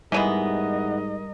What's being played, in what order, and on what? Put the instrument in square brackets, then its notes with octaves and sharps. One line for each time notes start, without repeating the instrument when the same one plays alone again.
[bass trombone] G#2 [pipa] E3 G#3 B3 [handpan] G3 [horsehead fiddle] A#4 D#5